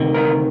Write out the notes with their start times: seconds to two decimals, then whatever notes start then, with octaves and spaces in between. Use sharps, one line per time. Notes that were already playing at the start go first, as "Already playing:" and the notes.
Already playing: D2 C3 D#3
0.14 A#4